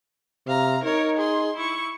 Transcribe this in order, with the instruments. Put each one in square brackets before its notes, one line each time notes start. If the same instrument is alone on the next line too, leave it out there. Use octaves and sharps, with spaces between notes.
[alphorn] C3 [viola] F5 A#5
[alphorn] D#4 [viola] A#4 C#5
[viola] G#4 C6
E4 C#6